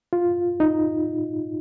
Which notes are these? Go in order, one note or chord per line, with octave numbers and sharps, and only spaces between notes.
F4
D#4